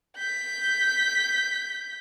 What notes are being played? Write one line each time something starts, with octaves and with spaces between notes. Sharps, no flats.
G6 B6